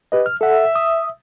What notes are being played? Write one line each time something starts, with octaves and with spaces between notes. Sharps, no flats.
G4 B4 D#5
F6
A4 E5 F#5
D#6